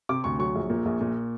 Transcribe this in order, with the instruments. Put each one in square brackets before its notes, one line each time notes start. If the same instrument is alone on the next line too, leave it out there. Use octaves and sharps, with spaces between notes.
[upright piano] C3 D6
D2 C#6
F#3 C#6
A#1
A#2
A#1
A#2